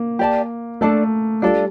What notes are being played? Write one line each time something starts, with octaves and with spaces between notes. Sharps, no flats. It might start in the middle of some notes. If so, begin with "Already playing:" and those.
Already playing: A#3
G4 D5 A5
A3 D4 A4 D5 A5
G3 D4 F4 A4 D5